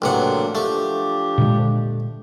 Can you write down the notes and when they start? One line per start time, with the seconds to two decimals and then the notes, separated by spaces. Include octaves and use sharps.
0.02 A1 C3 F#3 A#3 D4 F#5
0.55 F3 A3 D4 G4
1.38 A#2 D3 G#3